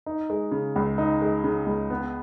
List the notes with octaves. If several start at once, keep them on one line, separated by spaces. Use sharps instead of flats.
D#4
G#3
C#3
C#2
D#4
G#3
C#3
C#2
B3